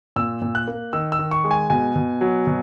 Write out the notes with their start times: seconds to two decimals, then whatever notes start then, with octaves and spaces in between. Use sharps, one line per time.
0.16 A#2 E6
0.42 A#2
0.55 F#6
0.68 A#3
0.93 D#3 E6
1.12 E6
1.19 D#3
1.31 C#6
1.44 G#3
1.51 G#5
1.70 B2 G#5
1.96 B2
2.21 F#3
2.47 B2